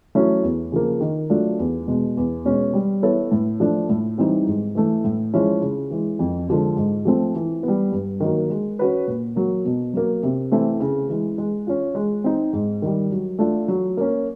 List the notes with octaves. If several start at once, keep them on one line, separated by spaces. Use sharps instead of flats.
F#3 A3 C#4 E4
E2
C#3 F3 A#3
D#3
F#3 A3 D4 F4
E2
B2 G#3
E2
B2 G#3 C#4
G3
B3 E4 A4 C#5
A2
F3 A3 D4
A2
E3 G3 C4 D#4
G#2
E3 A3
A2
F3 G#3 C#4 E4
C#3
E3 G#3
F2
D3 F3 G#3
G#2
F3 A3 C4
E3
B3
G3
G2
D#3 F#3 A#3
G#3
C#4 F#4 B4
A#2
F#3 A#3
B2
F#3 A#3
C3
E3 A3 C4 E4
C#3
E3 G#3
G#3
C#4 F4
G#3
C4 D#4
G#2
D#3 G3
F#3
A3 D4 F4
F#3
A#3 C#4